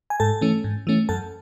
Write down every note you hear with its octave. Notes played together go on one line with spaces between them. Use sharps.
G#5
G#2 A4 A5
E3 A3 C#4
G#2
E3 A3 C#4
F#2 A4 A5